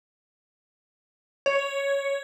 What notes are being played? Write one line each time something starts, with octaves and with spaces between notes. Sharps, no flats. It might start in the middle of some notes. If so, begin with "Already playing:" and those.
C#5